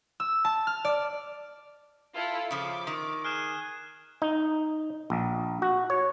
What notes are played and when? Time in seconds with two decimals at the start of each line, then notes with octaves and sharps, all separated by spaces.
0.20 E6
0.45 A5
0.67 F6
0.85 D5
2.15 E4 F4 A4
2.51 C#3 F3 D6
2.87 D#3
3.24 G#4 F6 F#6 E7
4.22 D#4
5.10 A#1
5.62 F#4
5.90 C#5